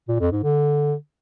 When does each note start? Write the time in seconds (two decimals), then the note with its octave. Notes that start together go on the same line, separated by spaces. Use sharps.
0.08 A#2
0.20 F2
0.32 G#2
0.43 D3